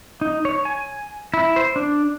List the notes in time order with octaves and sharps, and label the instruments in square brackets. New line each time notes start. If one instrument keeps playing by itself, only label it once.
[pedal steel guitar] D#4
C#5
G#5
E4
C5
D4